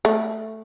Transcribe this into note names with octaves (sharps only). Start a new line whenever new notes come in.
A3